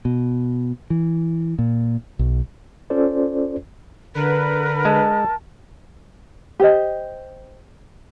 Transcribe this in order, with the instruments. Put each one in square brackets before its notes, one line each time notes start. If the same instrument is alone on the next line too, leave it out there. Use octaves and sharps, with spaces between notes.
[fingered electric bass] B2
E3
A#2
B1
[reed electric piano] C#4 F4 A4 C5 D5
[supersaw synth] D3 B4 [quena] A#4
[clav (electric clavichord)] G#3 [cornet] A5
[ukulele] G4 C5 D#5